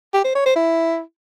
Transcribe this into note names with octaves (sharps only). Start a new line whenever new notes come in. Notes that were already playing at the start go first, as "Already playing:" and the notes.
G4
C5
C#5
C5
E4